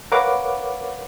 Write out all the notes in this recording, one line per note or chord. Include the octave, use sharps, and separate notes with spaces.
A#4 B4 C#5 F5 F#5 D6